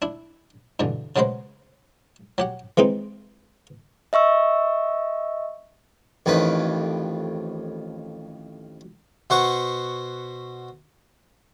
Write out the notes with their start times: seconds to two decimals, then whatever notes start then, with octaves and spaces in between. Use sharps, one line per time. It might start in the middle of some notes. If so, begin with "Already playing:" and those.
0.02 D4 E4
0.80 G2 B2 D3 E3
1.16 C#3 F#3 G#3 A#3 B4 C5
2.38 F#3 G4 F#5
2.77 E3 G#3 C4 D#4
4.13 D#5 E5 C#6 E6
6.26 A1 F2 D#3 B4
9.30 B2 C5 F#5 C#6